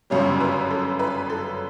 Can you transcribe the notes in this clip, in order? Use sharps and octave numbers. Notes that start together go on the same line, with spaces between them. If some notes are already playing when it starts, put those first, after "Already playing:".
G1 F#2 C#3 G3 C#5
B4
A4
B4
A4